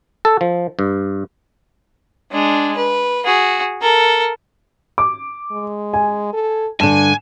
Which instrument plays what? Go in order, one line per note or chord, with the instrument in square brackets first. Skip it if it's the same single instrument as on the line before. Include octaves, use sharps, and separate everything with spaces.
[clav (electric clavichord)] A4
F3
G2
[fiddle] G#3 D4
B4
F#4 G#4
A4 A#4
[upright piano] D6
[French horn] G#3
[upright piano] G#5
[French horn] A4
[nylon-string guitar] G2 D3 [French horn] D4 [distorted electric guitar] G#5 [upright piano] A5 E7